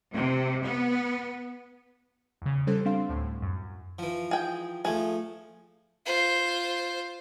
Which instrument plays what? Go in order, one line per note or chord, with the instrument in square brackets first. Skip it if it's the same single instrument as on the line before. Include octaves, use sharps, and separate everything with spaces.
[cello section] C3
B3
[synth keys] E2 C#3
E3 G3 C#4 E4 A4 C5
G3 C4 D4 F5 C6
D2 A2
F#2
[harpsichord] E3 F3
[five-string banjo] G#4 G5
[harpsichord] F3 A3 [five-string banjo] G#4
[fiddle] F4 C5